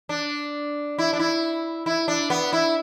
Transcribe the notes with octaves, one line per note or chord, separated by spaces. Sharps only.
D4
E4
D4
E4
E4
D4
B3
E4